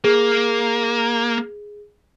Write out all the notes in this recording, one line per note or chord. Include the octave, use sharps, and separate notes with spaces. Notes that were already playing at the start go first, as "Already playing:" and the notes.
A#3 G#4